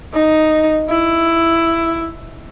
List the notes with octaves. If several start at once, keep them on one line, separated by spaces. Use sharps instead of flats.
D#4
E4